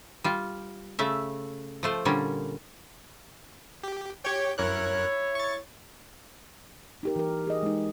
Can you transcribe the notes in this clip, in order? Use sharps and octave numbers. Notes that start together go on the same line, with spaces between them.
G3 F4
C#3 A3 E5
F3 A3 C5
A#2 D3 G3 C#4
G4
G4 C#5 G5
F#2 E4 A#4 C#5 F#6
C#6 A6
D#4 G4 A#4
E3 A#4
G#4 D#5
G#3 D#4